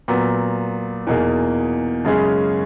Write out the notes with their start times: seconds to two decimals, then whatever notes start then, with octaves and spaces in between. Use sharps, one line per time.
0.08 A#2 F#3 B3
1.07 E2 B2 A#3 D#4 G#4
2.05 F#2 C#3 G#3 C#4 G#4